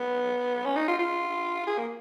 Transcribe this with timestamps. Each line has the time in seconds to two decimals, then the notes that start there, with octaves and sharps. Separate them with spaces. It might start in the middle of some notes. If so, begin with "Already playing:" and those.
Already playing: B3
0.66 C#4
0.76 D#4
0.88 F4
0.99 F4
1.67 G#4
1.78 A#3